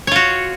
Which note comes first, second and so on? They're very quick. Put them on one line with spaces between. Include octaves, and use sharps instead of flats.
C#5 F4 F#4